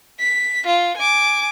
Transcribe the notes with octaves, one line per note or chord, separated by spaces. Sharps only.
B6
F4
G#5 D6